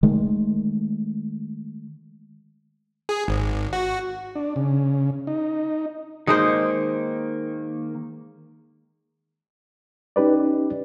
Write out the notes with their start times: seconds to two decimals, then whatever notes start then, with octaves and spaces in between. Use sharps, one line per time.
0.03 D#3 G#3 A3
3.09 G#4
3.28 G#1
3.73 F#4
4.36 D4
4.56 C#3
5.27 D#4
6.27 D#3 G#3 A#3 D#4 C5
10.16 C#4 D#4 G4 B4 D5